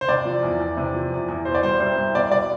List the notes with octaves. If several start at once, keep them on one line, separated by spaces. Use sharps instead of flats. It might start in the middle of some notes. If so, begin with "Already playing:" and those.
C5
C3 D5
F3
E2
E2
C3
F3
E2
E2
B2 C5
D5
G3 C5
C2 C5
C2
B2 D5
G3 D5